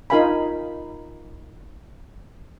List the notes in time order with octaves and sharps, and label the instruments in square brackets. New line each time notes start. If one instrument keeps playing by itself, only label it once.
[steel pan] D#4 F4 A#4 F5 G#5 B5